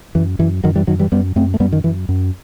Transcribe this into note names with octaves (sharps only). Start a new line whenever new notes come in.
F#2 E3
F#2 E3
F#2 D#3 F#3
E3 G3
F#2 D#3 F#3
E3 G3
F#2 G3 B3
F#2 A3 C4
A3
F#2 G3 B3
D#3
F#2 E3
F#2